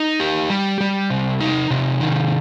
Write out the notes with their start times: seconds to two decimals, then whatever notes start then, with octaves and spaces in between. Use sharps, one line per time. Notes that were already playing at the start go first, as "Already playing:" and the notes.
Already playing: D#4
0.20 G4
0.50 G3
0.81 G3
1.10 C3
1.40 D#4
1.71 C3
2.01 D#3